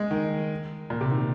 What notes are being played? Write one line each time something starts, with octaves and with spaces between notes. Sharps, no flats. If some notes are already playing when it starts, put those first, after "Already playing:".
Already playing: G#3
D#3
A#2
C3
D#3